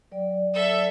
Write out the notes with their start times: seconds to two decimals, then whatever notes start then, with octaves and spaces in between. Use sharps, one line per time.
0.12 F#3 D5 G5
0.53 A4 E5